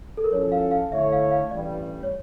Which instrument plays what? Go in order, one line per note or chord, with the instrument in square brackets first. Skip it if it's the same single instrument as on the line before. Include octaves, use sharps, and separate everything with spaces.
[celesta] A4
A#4
[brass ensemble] F3 C#4 E4 A4 [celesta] C#5
[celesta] F5
F5
[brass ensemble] D3 A3 E4 A4 C#5 [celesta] E5
[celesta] F5
F5
[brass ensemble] A1 G2 E3 G3 [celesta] D5
[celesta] C#5